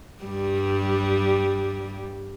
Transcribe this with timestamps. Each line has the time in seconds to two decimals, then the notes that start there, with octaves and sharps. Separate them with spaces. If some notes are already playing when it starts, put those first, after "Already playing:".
0.24 G2 G3